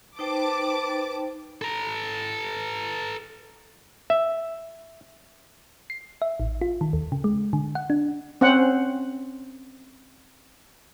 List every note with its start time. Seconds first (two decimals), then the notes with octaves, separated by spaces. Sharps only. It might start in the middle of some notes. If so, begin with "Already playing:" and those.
0.19 D#4 B4 C5 G5 A5 D6
1.62 A4 A#5
4.10 E5
5.90 C7
6.22 E5
6.40 A1
6.61 F4
6.81 D#3
6.93 D#2
7.12 C#3
7.24 G#3
7.53 D3
7.75 F#5
7.90 D4
8.41 C4 C#4 C5 F#5